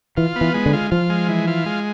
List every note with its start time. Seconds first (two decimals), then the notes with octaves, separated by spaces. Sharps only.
0.17 E3 F4
0.36 B3
0.41 E3
0.54 G#3
0.66 D3
0.73 F4
0.91 F3 F4
1.09 G#3
1.29 E3
1.47 F4
1.66 G#3